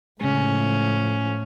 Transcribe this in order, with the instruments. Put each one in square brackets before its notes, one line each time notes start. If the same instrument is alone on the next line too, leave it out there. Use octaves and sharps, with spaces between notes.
[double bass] A2 F3 [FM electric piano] C#3 G#3 [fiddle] C#4